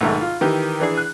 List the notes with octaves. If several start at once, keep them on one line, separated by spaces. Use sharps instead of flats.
B1 G#2 D#3 A3
F4
D#3 E3 G4
E3 D4 G#4
F#6